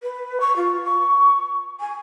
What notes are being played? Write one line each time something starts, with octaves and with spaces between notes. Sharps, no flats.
B4
C#6
F4
C#6
G#5